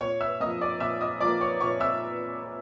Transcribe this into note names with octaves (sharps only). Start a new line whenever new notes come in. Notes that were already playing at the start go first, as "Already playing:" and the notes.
A#2 C#5 C#6
E5 E6
F3 A#3 D#5 D#6
D5 D6
A#2 E5 E6
D#5 D#6
F3 A#3 D5 D6
C#5 C#6
A#2 C#5 C#6
E5 E6